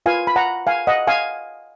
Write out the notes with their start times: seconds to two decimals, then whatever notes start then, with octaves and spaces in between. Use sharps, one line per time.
0.06 F4 B4 F5 G#5
0.27 B5
0.36 F#5 A#5
0.67 F5 G#5
0.87 D#5 F#5
1.07 F5 G#5